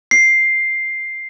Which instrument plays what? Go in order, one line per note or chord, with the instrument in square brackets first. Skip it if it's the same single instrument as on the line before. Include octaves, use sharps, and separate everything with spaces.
[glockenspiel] C7